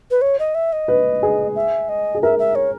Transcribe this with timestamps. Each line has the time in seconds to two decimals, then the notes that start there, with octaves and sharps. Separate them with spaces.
0.11 B4
0.22 C#5
0.39 D#5
0.55 E5
0.73 D#5
0.88 B4
1.23 G#4
1.56 E5
1.89 D#5
2.15 G#4
2.23 A#4 E5
2.39 E5
2.55 C#5